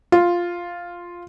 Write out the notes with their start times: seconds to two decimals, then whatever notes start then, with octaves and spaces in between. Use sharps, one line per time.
0.12 F4